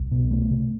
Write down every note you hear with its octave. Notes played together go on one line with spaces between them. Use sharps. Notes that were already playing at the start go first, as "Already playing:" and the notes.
Already playing: C2
B2
A3
C3